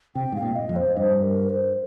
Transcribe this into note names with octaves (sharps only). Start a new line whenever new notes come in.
C3 G5
G#2 F5
A#2
D#5
F2
C5
G2 C5
A#4
C5